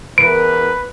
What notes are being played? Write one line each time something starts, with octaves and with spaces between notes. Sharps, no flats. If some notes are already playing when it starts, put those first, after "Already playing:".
E2 E3 A#4 B4 D7